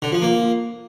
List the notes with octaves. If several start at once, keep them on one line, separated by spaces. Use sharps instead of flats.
D3
F3
A#3